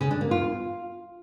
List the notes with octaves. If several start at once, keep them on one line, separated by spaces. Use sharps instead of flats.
C#3
D4
A#3
F4